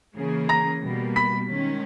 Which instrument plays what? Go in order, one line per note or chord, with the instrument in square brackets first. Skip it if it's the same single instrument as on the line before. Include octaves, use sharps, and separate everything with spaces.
[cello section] C#3 E3 A#3 C#4 G#4
[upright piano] A#5 A#6
[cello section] B2 G3 A#3
[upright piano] B5 B6
[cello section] D#3 G#3 C#4